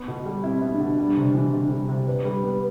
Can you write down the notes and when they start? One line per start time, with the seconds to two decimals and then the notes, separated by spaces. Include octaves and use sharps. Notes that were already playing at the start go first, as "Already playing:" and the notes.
Already playing: B3
0.08 B2
0.26 G3
0.43 C4 E4
0.62 B3
0.71 D4
0.80 B2
0.98 G3
1.17 C3
1.35 E3
1.53 C3
1.71 G3
1.89 C3
2.07 D4 B4
2.25 G3
2.44 B3